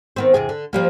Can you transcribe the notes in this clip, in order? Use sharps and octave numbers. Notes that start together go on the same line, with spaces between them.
D#3 B3 C4
E2 C3 G#4
D3
F3 G3 A#3